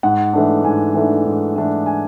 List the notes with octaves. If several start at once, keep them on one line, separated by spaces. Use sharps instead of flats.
G#2 F#5
E3 A3 D4
G#2 G#5
E3 A3 D4
G#2
E3 A3 D4
G#5